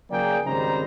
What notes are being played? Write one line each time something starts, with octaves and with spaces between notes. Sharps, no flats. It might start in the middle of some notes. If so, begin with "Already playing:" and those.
C#3 F#3 A#3 G#4 D5 G5
G#1 C#3 G3 D#4 C5 A#5